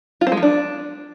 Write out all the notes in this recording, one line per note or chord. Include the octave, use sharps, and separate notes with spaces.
F4
C4
G#3
F3
D4